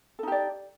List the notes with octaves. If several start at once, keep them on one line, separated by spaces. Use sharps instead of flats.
D#4 G4 A4 D5